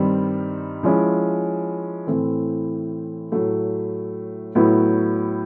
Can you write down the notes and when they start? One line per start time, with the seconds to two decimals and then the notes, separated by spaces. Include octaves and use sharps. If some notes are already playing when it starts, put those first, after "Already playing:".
Already playing: G2 D#3 G3 C4
0.83 F3 G#3 C#4 E4
2.07 A2 E3 A3 C4
3.32 A2 F#3 A3
4.55 A2 F#3 B3 E4